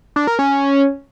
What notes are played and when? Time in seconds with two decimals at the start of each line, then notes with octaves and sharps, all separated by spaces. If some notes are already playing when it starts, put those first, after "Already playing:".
0.16 D4
0.27 A#4
0.39 C#4